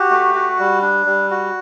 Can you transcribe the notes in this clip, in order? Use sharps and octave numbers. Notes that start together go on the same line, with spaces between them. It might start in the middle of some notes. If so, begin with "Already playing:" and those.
Already playing: F#4 G4
A3
F#4
G3
D4
G3
F#4